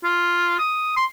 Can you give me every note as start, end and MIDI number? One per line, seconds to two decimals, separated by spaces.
0.04 0.54 65
0.59 0.95 87
0.96 1.05 84